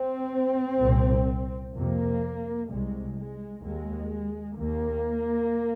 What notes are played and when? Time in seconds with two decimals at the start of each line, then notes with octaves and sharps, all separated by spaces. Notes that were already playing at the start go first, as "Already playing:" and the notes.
Already playing: C4
0.79 C2 A#2
1.74 F2 C3 A#3
2.68 C2 C3 G#3
3.16 G#3
3.63 D#2 G#3
4.57 D#2 A#3